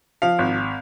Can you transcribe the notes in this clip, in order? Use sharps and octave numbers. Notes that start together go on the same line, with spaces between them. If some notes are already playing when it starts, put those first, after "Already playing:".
F3 F5
G#1